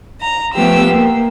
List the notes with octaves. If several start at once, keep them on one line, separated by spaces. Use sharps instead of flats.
A#5
F3 A3 B3 G4 E6
A#3